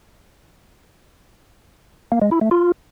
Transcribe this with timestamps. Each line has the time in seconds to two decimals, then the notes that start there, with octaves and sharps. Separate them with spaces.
2.12 A#3
2.22 G#3
2.31 E4
2.41 A3
2.51 F4